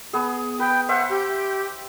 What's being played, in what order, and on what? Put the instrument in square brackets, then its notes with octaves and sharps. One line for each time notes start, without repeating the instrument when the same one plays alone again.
[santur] B3 G#4
[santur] B4 [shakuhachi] G5
[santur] C5 E5 G5 [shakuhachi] F#5
[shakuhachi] G4